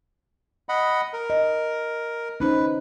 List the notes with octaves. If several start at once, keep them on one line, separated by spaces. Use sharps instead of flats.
D#5 F#5 B5
A#4
D#5
C#4 D#4 B4 C5